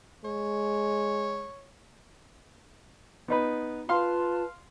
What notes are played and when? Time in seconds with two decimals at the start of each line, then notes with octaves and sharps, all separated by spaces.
0.25 G#3 C#5
3.28 B3 D#4 B4
3.89 F4 B4 F5 A5 C6